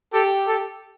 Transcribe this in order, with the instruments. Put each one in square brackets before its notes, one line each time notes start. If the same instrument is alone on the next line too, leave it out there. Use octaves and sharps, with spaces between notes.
[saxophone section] G4 [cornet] A4
[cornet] A4